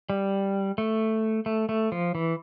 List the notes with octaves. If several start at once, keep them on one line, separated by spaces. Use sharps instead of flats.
G3
A3
A3
A3
F3
E3